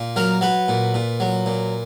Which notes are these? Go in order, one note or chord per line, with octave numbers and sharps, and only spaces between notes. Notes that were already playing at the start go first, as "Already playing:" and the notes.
Already playing: A#2
F#3 A#4
F#3 B4
A#2
A#2
F#3
A#2